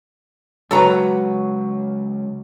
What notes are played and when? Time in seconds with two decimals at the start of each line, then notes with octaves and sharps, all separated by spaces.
0.71 C#2 F#3 F#4 A4 B4 C#5 A#5